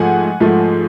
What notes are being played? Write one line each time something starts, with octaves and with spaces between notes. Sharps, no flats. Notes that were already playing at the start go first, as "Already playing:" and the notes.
Already playing: G#2 F3 A3 F#5 G#5
G#2 F3 A3